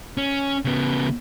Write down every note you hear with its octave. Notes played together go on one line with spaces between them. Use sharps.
C#4
C#3 B3